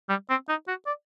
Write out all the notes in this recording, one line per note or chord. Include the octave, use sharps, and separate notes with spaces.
G3
C4
D#4
F#4
D5